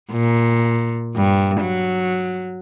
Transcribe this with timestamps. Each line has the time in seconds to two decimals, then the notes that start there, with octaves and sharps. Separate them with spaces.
0.12 A#2
1.16 G2
1.61 F#3